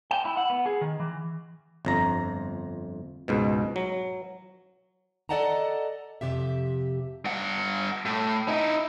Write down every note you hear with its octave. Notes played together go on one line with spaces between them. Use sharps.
G5
E4
F#5
B3
G#4
D#3
E3
G1 F2 A#5
C#2 G#2 B2
F#3
A4 D5 D#5 F#5 A5 A#5
F2 G#2 C3 G4 E5
G2 F#5
A2
D#4 E4